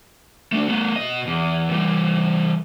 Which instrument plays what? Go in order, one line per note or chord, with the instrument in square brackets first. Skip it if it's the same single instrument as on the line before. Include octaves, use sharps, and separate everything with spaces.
[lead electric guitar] A3 D4
A3 B3
B2 D#5
E2
E3 G3